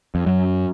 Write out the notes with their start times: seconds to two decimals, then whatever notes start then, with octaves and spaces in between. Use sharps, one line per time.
0.15 F2
0.26 F#2